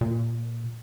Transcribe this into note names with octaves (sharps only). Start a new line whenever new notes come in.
A#2